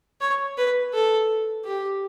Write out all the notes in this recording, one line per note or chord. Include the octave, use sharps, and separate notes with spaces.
C#5
B4
A4
G4